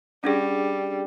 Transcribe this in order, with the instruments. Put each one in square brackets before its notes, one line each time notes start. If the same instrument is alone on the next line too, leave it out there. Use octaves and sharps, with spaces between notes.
[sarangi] G3 [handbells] C#4 D4 G#4